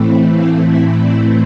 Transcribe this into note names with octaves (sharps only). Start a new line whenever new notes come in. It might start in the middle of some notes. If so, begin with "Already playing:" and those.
Already playing: A2 E3 A3 C4 E4
F5
E5
D5